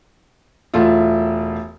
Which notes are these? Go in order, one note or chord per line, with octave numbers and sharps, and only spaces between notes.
E1 A3 E4 F4